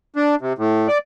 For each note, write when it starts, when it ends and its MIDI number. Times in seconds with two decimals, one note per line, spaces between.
0.16 0.35 62
0.41 0.53 48
0.58 0.88 45
0.88 0.98 74